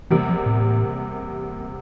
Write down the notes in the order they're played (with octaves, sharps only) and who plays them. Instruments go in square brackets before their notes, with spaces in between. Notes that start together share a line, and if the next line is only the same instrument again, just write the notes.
[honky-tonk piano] E2 C3 G3 A#3 [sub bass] E3
[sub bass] F3
A2